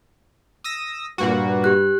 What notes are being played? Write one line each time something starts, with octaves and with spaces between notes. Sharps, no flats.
D#6 E6 A#6
G2 A#2 A#3 F#4 B4
G4 F#6